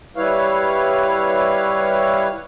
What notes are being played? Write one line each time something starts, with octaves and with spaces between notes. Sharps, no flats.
G3 E4 B4 C#5 F5